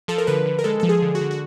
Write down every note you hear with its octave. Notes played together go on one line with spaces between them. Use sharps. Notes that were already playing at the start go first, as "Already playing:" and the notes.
F3 A4
A#4
D3 B4
D3
A#4
G#3 A4
F3 A4
G#4
D3
F#4
D3
F#4